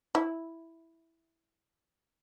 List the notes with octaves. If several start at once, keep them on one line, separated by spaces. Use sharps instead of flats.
E4